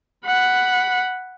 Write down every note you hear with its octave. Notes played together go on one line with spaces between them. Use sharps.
F#5 B5